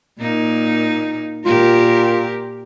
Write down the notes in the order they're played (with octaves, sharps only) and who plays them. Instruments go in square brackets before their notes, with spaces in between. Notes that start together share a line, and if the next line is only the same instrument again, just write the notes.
[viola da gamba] A#2 A#3 D#4
[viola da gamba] A#2 G4 A#4 [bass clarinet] F4